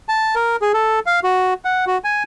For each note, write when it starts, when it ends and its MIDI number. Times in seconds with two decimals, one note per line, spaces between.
0.09 0.35 81
0.35 0.56 70
0.62 0.72 68
0.74 1.00 69
1.06 1.20 77
1.24 1.54 66
1.65 1.85 78
1.87 1.98 66
2.04 2.23 80